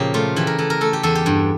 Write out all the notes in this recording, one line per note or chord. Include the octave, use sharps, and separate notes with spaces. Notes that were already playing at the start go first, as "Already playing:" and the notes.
Already playing: A#2 C#3 F3 G4
A3 F4
E3 G4
A#4
E3 A4
A#4
A3 A4
G4
E2 A4
G4
G2